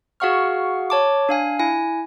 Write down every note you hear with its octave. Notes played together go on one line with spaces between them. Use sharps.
F#4 G#4 F5 F#5 C#6 F6
C#5 A5 D6
D4 F5 G#5
E4 G#5